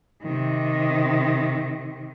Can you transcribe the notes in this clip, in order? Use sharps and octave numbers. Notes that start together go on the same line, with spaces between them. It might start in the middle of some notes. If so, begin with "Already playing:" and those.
C3 D#3